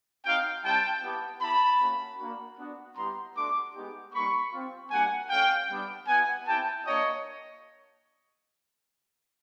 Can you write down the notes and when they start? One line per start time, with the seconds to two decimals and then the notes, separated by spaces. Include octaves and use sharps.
0.24 C4 D#4 F#4 F5 G5
0.63 G3 C4 E4 G5 A5
1.02 B3 E4 G4
1.41 B3 E4 G4 A5 B5
1.80 A#3 C#4 F#4
2.19 A#3 D4 F#4
2.58 B3 D4 F#4
2.96 G3 B3 E4 G4 A#5 C6
3.35 A3 D4 F#4 C6 D6
3.75 G#3 B3 D#4 G4
4.13 G3 A#3 D#4 B5 C#6
4.52 C4 F4
4.91 G3 A#3 D4 F#4 F#5 G#5
5.30 A3 C#4 F#4 F5 G5
5.69 G3 B3 D4
6.08 B3 E4 G4 F#5 G#5
6.46 C4 E4 G4 G5 A5
6.85 A#3 D4 F#4 C#5 D#5